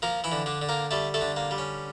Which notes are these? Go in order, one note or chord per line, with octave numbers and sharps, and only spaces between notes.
F3 A#3 A#4
E3 E4
D3
D3 D4
D3
A#3 A#4
G3 A3 A4
A3 A4
D3
A#3
G3
C#4